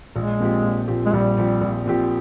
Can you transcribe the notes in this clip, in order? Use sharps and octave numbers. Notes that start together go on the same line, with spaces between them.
A#1 G#3
A#2 F3 C4 G4
A#1
A#2 F3 C4 G4
G#3
A#1 G3
A#2 F3 C4 G4
A#1
A#2 F3 C4 G4